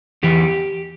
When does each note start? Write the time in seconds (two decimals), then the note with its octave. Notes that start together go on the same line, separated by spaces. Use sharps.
0.23 E2 E3 G4